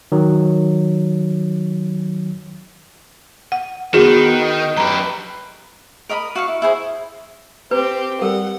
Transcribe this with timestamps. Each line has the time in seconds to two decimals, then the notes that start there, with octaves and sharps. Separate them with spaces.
0.12 D#3 F#3
3.52 F#5
3.94 D#3 B3 F#4 G#4
4.42 D#5
4.77 F#2 G4 B4 A#5
6.09 A#4 D#5 B5 D#6
6.36 F#4 F5 C#6
6.48 E4
6.62 E4 G#4 C5
7.71 C4 G4 B4
8.22 G3 A4 A#4 F#5